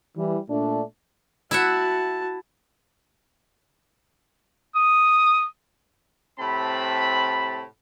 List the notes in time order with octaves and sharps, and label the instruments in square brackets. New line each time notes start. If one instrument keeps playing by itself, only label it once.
[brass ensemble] E3 G3
A#2 A3 D4
[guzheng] E4 E5 F#5 [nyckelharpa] F#4 A5
[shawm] D#6
[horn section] A2 C3 C4 A5 B5